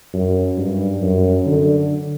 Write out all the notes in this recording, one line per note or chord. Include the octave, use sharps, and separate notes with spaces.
F#2
G2
F#2
D3